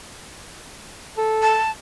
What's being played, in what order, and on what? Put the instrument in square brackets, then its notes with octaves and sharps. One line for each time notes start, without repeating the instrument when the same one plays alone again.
[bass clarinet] A4
[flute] A5